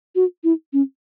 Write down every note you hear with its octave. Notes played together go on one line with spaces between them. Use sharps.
F#4
E4
C#4